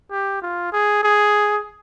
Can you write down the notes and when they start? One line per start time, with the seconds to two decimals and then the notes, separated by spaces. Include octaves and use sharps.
0.11 G4
0.42 F4
0.72 G#4
1.03 G#4